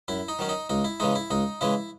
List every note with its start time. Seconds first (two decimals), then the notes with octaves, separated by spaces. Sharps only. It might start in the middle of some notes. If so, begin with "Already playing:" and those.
0.08 F#2 E4
0.28 D#4
0.39 D#3 F#3 C#4
0.49 D#4
0.69 C#2 D#4
0.84 E4
1.00 C#3 E3 G#3 D#4
1.15 E4
1.30 C#2 D#4
1.61 C#3 E3 G#3 E4